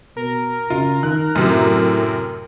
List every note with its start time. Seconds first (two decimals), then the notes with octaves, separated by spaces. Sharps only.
0.17 B2 A#4
0.70 C#3 F4
1.03 D#3 F#6
1.35 F#2 A2 C3